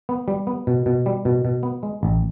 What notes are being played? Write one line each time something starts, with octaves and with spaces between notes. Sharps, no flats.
B3
G3
B3
B2
B2
G3
B2
B2
B3
G#3
A1